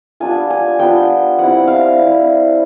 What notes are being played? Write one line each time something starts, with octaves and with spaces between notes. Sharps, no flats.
G3 B3 D4 F4 G#5
G#5
G3 B3 D4 F4 G5
G3 C4 E4 F#5
F5
G3 C4 E4